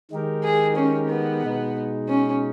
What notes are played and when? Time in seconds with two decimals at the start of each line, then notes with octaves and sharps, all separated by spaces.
0.11 D#3 G#3 D#4 G4 A#4
0.43 G#4
0.76 C#4
1.09 B3
1.42 B2 G#3 D#4
2.09 C#4